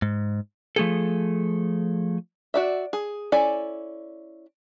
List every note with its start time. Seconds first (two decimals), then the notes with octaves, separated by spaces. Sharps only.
0.02 G#2
0.76 F3 A3 G#4 A4
2.54 F#4 D5 E5
2.93 G#4
3.32 C#4 E4 A4 D5 G#5